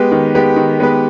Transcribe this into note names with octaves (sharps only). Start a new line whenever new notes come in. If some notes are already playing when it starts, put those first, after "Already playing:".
Already playing: G#3 B3 G4 B4
D#3
G#3 B3 G4 B4
D#3
G#3 B3 G4 B4